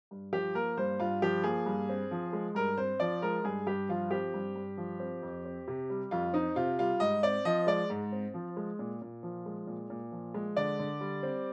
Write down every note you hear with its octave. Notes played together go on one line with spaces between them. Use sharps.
G2
F3 G4
A#3 A#4
G2 C5
G2 F4
F3 G4
A#3 G#4
G2
C4
F3
G#3
G2 A#4
C4 C5
F3 D5
G#3 A#4
G2 G#4
G2 G4
F3 F4
C4 G4
G2
G2
F3
C4
F2
C4
C3
G3
F2 F4
C4 D#4
C3 F4
G3 F4
G#2 D#5
C4 D5
F3 D#5
G#3 D5
G#2
C4
F3
G#3
A#2
A#2
F3
G#3
A#2
A#2
F3
G#3
D3 D5
D3
G3
C4